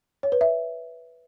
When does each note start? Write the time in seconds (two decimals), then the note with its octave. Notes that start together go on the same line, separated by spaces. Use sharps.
0.23 C#5
0.32 B4
0.41 E5